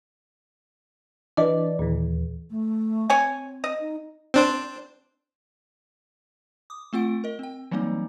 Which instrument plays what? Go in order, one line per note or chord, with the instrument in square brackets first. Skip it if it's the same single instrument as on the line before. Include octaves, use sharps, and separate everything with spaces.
[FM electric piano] E3 D4 D5 [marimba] B4 D#5
[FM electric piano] D#2 E3 [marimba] A#2
[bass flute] A3
[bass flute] C4 [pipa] C#5 G#5
[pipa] D#5
[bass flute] D#4
[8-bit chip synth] C4 D4 C5
[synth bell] D6 D#6
A3 C4 F4 F#5 D7
A#4 D#5
C4 G5
E3 F#3 G3 A#3 C4 D#4